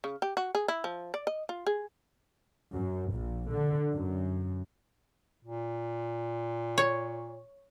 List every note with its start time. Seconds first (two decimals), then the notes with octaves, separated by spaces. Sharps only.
0.04 C#3
0.22 G4
0.37 F#4
0.55 G#4
0.68 E4
0.84 F3
1.14 D5
1.27 D#5
1.49 F4
1.67 G#4
2.73 F#2
3.12 A#1
3.50 D3
3.92 F#2
5.45 A#2
6.78 C#5